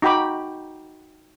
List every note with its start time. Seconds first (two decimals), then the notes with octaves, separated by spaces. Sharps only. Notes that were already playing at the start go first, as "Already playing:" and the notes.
0.02 D#4 F#4 G5 B5 D6